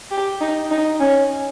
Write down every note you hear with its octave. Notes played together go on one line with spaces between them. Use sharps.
G4
D#4
D#4
C#4